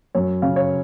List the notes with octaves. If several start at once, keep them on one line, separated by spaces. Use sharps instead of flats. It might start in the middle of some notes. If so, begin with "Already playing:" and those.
F#2 C#5
C#3 F5
C#5